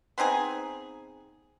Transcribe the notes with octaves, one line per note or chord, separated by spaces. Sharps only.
B3 C4 D#4 G#4